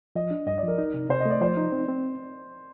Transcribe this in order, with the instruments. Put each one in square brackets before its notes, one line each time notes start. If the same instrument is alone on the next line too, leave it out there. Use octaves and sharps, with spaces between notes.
[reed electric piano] F3 [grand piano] D#5
[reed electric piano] D4
[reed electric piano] G2 [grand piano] D#5
[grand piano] D5
[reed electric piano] F3 [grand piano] A#4
[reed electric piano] D#4
C3
[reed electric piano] C3 [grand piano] C5
[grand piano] D#5
[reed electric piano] A3 [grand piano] D5
[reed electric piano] F3 [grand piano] C5
[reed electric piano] D#4
C4
C4